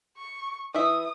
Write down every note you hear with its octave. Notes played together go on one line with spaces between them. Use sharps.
C#6
E3 E4 E5 D#6